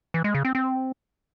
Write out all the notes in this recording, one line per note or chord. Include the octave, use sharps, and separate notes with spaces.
E3
G#3
C#3
C4
C4